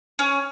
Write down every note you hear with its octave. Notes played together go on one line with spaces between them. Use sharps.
C#4